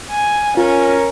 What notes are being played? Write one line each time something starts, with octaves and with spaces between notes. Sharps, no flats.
G#5
C#4 F4 A#4